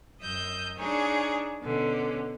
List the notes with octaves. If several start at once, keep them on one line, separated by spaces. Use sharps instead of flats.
F#2 D#5 E6 G6
D4 D#4 G#4 C#5
B2 D3 C#4